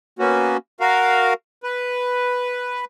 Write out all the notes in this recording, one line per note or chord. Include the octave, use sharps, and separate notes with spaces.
A#3 B3 C#4 F#4
F#4 A#4 F5
B4